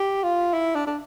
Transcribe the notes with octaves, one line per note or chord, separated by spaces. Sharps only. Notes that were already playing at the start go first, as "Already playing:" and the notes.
Already playing: G4
F4
E4
D4
D4